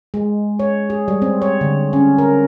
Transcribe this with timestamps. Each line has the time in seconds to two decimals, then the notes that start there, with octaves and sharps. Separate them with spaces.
0.14 G#3
0.59 C#5
0.90 G#4
1.08 G3
1.22 C4
1.42 C#5
1.61 D3
1.93 C#4
2.18 A#4